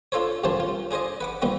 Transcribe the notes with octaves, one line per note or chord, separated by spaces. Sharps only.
D4 F4 A4 C5 C#5
C2 F#2 C3 E3 C5 A5
F4
D4 G#4 C5 D5 D#5
B4 F#5 D6
A#2 D#3 G3 B3 C4